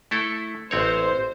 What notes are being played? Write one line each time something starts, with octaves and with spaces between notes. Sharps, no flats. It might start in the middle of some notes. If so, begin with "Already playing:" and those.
A3 E4 A4
A1 C4 C5 C#5